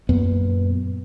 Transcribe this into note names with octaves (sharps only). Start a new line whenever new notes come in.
F#2 A#2 B3